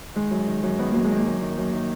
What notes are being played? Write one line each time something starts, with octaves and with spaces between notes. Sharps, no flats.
D#3 G#3
F#2
D#3
F#2
D#3 B3
F#2 A#3
G#3
D#3
A#3
F#2
D#3
F#2
D#3